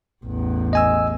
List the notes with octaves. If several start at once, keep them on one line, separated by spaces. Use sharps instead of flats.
A1 E2
D#5 G#5 E6